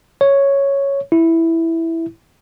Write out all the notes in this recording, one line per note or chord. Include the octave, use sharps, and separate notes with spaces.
C#5
E4